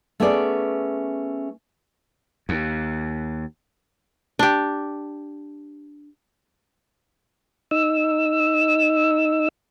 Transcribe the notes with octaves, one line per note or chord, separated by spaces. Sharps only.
A3 B3 C#4 G#4 D5
D#2
D4 G4
D#4 E6